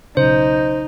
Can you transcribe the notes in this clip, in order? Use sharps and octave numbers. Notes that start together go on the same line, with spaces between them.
B1 C#3 D#4 C5